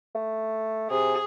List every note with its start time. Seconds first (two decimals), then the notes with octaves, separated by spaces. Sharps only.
0.15 A3
0.90 C3 G#4